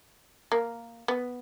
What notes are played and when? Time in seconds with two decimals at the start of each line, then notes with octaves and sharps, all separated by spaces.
0.52 A#3
1.08 B3